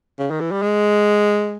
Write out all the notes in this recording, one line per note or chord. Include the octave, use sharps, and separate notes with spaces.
C#3
D#3
E3
G3
G#3